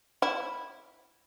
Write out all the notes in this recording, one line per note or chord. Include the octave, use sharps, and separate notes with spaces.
E4